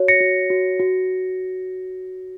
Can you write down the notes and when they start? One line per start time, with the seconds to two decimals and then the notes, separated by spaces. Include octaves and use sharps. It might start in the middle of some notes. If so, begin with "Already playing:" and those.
Already playing: F#4 C#5
0.08 A#6 C#7
0.21 F#4
0.50 F#4
0.80 F#4